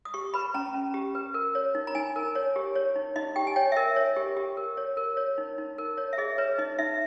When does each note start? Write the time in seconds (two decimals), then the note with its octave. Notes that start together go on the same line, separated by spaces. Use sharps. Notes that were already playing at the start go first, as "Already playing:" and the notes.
0.05 D#6
0.14 G4 C#6
0.34 B4 B5
0.54 C#4 A#5
0.74 C#4
0.94 G4
1.15 B4
1.34 A#4
1.55 C#5
1.75 D#4
1.87 A#5
1.95 D#4 G#5
2.16 A#4
2.35 C#5
2.56 G4
2.76 C#5
2.96 D#4
3.16 D#4 D#5
3.36 G4 G5
3.47 G#5
3.56 C#5 G5
3.72 E5
3.76 A#4 D#5
3.96 C#5
4.17 G4
4.37 G4
4.57 A#4
4.77 C#5
4.97 A#4
5.17 C#5
5.38 D#4
5.58 D#4
5.78 A#4
5.97 C#5
6.13 E5
6.18 G#4 D#5
6.38 B4 C#5
6.58 D#4 D#5
6.79 D#4 E5